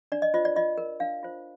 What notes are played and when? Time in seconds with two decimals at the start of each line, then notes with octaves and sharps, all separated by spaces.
0.12 D4 D5
0.22 D#5
0.34 F4 C5 D#5
0.45 D5
0.56 F4 D#5
0.78 A#4
1.00 D4 F5
1.23 F4 C5